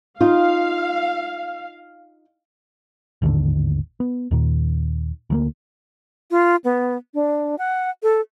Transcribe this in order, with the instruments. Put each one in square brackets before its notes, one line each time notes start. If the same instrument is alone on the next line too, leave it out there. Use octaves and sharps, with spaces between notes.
[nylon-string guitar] D#4 F4 [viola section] F5
[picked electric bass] G#1 D#2 A2 D3
B3
D#2 A#2 D#3
D2 F#3 A#3
[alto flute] F4
B3
D4
F#5
A4